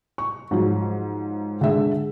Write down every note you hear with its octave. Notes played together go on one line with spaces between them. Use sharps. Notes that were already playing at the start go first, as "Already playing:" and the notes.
C#6
G#2 F3 F#3
D3 G#3 E5